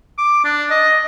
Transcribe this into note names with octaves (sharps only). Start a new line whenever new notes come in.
D6
D4
D#5